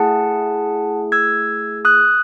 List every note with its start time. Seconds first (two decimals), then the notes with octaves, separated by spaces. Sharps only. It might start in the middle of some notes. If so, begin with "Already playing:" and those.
Already playing: A3 E4 G#4 F#5 A5
1.12 E6 G#6
1.85 D#6 F#6